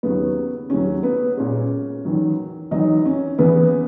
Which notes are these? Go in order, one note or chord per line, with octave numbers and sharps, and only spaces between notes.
D#2 C#3 F#3 B3
D#2 C#3 F#3 C#4
B3
A#2 G#3 C#4
E2 D#3 F#3
E2 D#3 F#3 D#4
C#4
E2 C#3 E3 B3